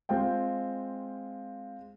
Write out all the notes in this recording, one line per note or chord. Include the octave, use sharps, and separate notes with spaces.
G#3 C4 F4 G5